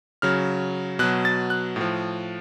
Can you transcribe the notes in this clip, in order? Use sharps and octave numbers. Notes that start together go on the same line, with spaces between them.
C#3 F#3 F6
B2 F#3 F#6
A6
F#6
A2 F3